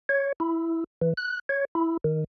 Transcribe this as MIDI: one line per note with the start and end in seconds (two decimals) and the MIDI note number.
0.09 0.32 73
0.40 0.84 64
1.02 1.14 52
1.17 1.39 90
1.49 1.65 73
1.75 1.97 64
2.04 2.24 51